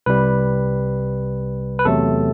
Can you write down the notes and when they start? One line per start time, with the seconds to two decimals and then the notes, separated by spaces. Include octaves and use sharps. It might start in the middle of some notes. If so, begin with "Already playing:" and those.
0.06 C2 C3 G3 B4
1.79 B4
1.85 E2 C3 F#3 A3 A4